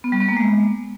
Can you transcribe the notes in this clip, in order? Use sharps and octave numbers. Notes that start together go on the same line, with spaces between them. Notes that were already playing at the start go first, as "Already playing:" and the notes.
B3
G3
B3
A#3
G#3